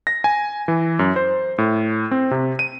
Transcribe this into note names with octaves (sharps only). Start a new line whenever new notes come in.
A#6
G#5
E3
F#2
C5
A2
C4
C3
D#7